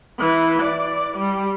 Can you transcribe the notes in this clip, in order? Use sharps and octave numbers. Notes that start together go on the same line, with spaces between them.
E3
D5
G3